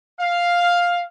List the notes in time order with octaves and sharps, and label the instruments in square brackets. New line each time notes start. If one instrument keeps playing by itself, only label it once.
[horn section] F5